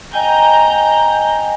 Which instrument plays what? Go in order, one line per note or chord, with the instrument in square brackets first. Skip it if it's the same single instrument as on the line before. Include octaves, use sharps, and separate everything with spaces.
[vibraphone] D#5 G5 G#5 [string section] A#5 G6